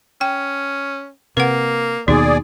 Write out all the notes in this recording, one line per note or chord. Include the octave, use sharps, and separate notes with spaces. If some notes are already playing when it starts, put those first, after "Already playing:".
C#4 G5
C3 A#3 B4 F#5
D#2 B2 D#4 G#4 D5